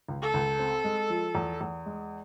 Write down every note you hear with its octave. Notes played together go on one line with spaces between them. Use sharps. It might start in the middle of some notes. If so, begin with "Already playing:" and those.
C#2
A4
C#2
C4
G#3
F3
E2
E2
G#3